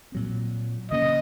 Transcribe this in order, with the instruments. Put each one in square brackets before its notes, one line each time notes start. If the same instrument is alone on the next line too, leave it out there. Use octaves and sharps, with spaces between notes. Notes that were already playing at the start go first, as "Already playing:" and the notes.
[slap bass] A#2 F#3 C4
[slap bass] C#3 F#3 A#3 C#4 [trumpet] D#5